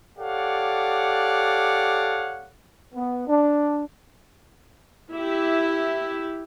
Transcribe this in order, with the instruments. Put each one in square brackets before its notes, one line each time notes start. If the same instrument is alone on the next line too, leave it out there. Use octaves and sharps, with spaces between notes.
[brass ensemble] G4 A4 C#5 D5 F5 F#5
[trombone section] B3
D4
[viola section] E4 G4 E5